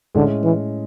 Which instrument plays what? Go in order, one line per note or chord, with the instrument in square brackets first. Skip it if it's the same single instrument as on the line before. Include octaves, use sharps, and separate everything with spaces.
[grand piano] A2 G#3 C#4 [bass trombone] D3
[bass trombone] E3